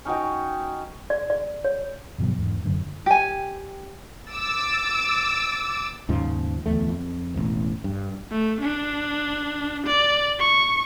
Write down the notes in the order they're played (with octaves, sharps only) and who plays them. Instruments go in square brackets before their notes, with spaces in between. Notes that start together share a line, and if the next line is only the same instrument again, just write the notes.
[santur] C#4 D#4 F#4 G5
[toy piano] D5
D5
C#5
[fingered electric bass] G1 B2 F3 F#3
E2 G#2
F1 F#2 D3
[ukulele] G4 G#5
[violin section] D6 E6 A6
[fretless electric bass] D#2 G#2 C#3 F3
D1 G#1 E2 A3
F2
E1 A1
G2
[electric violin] A3
D4
D5
C#6